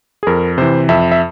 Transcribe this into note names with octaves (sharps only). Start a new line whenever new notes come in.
G#4
F2 A#4
C3 E3 C5
F2 E5
E5